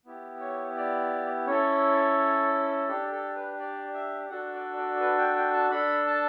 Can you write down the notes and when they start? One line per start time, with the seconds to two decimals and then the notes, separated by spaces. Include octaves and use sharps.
0.05 B3 E4 G4
0.40 C#5
0.76 D5
1.46 C#4 E4 A4 C#5
2.88 D4 G4 A4
3.12 A4
3.35 B4
3.59 D5
3.94 E5
4.30 D4 F#4 A4 F#5
4.53 D5
4.77 D5
5.00 B4
5.18 G5
5.36 G5
5.53 A5
5.71 D4 A4 B5
6.07 A5